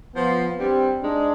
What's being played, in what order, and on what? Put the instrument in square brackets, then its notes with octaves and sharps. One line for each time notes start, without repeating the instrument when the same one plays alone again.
[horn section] F3 [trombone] B3
[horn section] G2 G3 [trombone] C4
[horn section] G#2 G#3 [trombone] D4